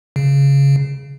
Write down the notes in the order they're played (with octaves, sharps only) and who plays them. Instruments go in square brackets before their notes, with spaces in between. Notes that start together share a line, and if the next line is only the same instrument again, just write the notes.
[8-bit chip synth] C#3